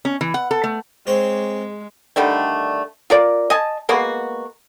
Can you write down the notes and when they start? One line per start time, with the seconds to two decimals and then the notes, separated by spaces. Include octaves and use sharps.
0.05 C#4
0.21 E3
0.34 F#5
0.51 A4
0.64 A3
1.07 G#3 C4 C5 C#5
2.16 D3 D#3 G3 A3
3.10 F4 A#4 D5
3.50 D#5 G#5 A5
3.89 G#3 A#3 B3 F#4